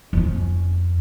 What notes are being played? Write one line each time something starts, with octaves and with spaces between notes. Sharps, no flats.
F2 C#4